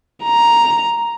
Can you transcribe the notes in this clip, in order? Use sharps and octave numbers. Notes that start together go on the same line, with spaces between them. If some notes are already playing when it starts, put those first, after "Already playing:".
A#5